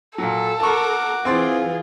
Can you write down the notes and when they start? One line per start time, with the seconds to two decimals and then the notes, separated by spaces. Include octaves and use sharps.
0.18 A#2 F#3 A4
0.60 F#4 A#4 A5 C#6 D6
1.25 E3 C4 F4 G#4 C6 A6